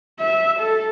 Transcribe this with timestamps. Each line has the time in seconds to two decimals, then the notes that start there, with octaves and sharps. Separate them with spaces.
0.20 E5
0.60 A4